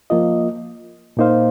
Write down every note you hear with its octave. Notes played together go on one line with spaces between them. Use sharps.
F3 A#3 F4 D#5
A#2 A#3 D#4 C5 F5